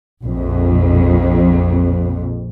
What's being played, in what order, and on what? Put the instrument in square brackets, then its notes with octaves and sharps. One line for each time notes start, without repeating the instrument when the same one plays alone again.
[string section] A#1 F2